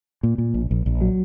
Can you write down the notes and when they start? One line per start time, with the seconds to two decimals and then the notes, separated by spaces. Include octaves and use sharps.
0.23 A#2
0.38 A#2
0.54 A#1
0.71 A#1
0.86 A#1
1.01 F#3